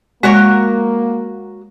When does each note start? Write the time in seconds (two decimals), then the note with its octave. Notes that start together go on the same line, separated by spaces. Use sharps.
0.23 G#3 A#3 F#4 A#4 C#5